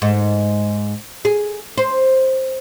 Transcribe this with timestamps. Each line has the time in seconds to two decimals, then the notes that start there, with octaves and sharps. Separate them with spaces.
0.02 G#2
1.25 G#4
1.78 C5